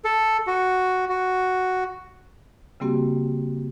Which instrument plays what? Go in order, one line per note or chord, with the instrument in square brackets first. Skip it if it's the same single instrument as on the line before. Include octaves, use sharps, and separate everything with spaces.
[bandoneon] A4
F#4
F#4
[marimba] C#3 G3 A#3 C4 F#4 G4